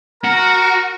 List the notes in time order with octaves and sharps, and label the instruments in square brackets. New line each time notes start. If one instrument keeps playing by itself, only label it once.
[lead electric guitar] F#4 [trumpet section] A#4 A#5